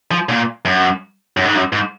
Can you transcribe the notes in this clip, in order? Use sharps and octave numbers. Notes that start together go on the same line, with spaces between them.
F3
A#2
F#2
F#2
G#2
F#2
G#2